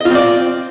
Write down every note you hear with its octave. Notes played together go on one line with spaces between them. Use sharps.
C4 F4 D5 D#5